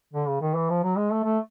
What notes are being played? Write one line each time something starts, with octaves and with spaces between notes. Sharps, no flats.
D3
C#3
D#3
E3
F3
F#3
G#3
A3
A3